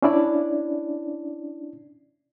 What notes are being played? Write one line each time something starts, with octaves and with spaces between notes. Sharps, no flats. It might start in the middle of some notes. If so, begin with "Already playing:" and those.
C#4 D4 E4 D5